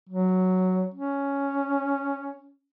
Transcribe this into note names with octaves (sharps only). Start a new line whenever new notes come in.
F#3
C#4